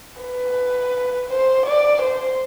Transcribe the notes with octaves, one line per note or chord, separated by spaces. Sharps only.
B4
C5
D5
C5